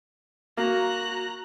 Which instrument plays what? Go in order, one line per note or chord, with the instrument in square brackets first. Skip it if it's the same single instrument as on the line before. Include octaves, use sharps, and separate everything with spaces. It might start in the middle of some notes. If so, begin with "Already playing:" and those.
[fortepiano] A#3 [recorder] F#4 [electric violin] A#5 F#6